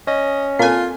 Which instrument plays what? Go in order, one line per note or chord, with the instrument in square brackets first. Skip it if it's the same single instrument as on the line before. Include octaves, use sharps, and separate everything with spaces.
[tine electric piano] C#4 [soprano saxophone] D#5
[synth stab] A#2 G#5 [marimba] C4 A4 [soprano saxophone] F4